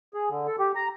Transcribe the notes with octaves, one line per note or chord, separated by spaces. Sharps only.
G#4
D3
A4
G4
A#5